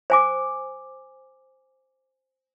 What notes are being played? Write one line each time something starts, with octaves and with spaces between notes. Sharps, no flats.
C5 G#5 D6